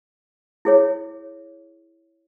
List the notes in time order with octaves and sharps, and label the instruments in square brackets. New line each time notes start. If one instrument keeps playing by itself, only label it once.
[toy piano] E4 G#4 C#5